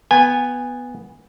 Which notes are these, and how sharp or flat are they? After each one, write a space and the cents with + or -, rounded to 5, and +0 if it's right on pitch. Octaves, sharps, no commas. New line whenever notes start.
B3 +0 G#5 -20